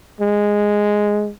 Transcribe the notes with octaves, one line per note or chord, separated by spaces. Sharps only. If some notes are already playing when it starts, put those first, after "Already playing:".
G#3